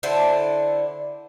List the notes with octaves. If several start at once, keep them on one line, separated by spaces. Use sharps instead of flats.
D3 E4 A4 C5